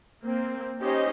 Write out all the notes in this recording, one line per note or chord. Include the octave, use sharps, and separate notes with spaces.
A#3 C4
C#4 D#4 G4 C5 D#5